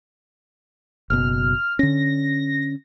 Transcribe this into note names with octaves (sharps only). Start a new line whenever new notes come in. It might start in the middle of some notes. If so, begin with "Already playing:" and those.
F#1 B2 F6
D3 C#4 A#6